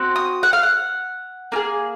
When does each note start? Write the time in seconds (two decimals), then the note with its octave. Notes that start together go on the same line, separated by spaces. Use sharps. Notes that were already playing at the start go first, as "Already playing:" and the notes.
Already playing: C4 F#4
0.16 D#6
0.43 F#5
0.53 F5
0.63 F#5
1.52 A#3 F4 G#4